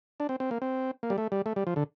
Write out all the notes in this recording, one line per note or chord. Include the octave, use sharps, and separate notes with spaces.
D4
C4
C4
A#3
C4
A#3
G3
A3
G3
A3
G3
F3
D3